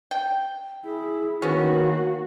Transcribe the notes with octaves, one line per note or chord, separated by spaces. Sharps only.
G5
E4 G#4
D#3 A#3 B3 C#4 F#4